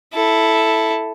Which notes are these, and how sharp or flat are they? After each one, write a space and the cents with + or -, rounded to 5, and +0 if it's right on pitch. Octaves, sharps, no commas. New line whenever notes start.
E4 +0 A4 +0